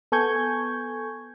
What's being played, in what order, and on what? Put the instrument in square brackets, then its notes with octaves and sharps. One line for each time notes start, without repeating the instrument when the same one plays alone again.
[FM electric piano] B3 A4 G#5 C#6 G6 G#6